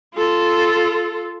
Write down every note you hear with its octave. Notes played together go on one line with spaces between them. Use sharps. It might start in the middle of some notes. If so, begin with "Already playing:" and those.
F4 A4